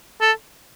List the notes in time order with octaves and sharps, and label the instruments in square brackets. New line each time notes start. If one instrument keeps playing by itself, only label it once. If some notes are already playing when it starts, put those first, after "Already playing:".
[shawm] A4